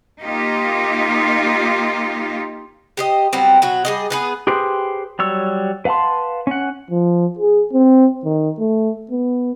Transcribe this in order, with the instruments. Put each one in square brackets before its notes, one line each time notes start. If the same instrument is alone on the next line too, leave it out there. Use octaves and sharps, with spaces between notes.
[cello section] A#3 D#4 F4 G4
[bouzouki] G4 C5 D#5
F#3 G3 B3 C4
B2 F#3 F#4
G3 G#4 D#5
B3 G#4 B4
[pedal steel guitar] G4 G#4 B4 C5 G5
F#3 G3 C#5 E6
B4 F5 F#5 A5 C6
C#4 F#5
[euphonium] F3
G#4
C4
D#3
A3
B3